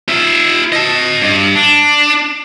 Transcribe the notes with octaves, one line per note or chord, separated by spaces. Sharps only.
F4 E5
D#5 A5
G2
D4